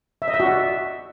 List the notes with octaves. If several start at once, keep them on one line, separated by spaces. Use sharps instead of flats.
E5
D#5
E5
F#4
D5